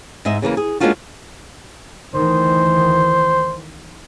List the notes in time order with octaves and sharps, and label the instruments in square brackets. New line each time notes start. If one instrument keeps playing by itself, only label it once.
[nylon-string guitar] G#2 G#3 D#5 E5
C#3 E3 A3 A#3
G#4
G#3 A#3 C#4 D4 F4 F#4
[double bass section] D2 D#3 E3 [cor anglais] C5